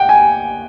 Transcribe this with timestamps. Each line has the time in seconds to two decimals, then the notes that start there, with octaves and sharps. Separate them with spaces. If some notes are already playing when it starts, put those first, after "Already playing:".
Already playing: F#5 G5
0.09 G#5